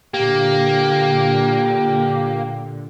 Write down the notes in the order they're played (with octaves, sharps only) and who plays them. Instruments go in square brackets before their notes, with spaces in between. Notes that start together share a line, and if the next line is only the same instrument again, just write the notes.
[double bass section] A#2 D3 [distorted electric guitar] A#3 [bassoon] G4